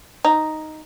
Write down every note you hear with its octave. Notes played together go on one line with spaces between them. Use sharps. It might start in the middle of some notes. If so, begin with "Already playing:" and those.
D#4